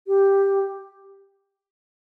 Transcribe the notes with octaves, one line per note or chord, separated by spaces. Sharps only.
G4